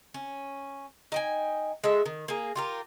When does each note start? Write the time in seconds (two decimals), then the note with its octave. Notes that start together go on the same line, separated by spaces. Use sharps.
0.14 C#4
1.12 D#4 G5 G#5
1.84 G#3 A4 E5
2.06 D#3
2.28 A#3 G#4
2.55 F4 G4 A#4